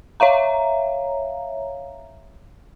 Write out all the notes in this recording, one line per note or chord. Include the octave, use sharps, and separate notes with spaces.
C#5 E5 F5 A#5